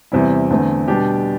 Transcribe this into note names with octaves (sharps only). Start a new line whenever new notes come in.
E2 C3 G3 C4 E4
E2 D3 A3 C4
B2 G3 D4 G4